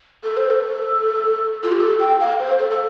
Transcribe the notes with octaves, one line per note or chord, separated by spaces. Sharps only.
A4
C5
A4
F4
G4
A4
G5
F5
C5
A4
A4